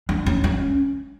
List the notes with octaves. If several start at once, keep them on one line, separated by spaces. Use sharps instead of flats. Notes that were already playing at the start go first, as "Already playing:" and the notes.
D4
C#4
C#4